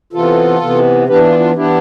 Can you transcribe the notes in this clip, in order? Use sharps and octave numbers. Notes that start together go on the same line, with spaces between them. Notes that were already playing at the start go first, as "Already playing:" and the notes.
C3 E3 B3 F4 A4
C3 E3 B3
E3 B3 D4 G4 B4
F4
F4
E3 B3 D4 E4 G4